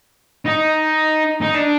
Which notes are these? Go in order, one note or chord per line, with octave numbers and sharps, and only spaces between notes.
D#4
D#4
D4